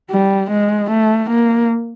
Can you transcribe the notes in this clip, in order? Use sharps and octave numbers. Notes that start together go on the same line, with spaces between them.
G3
G#3
A3
A#3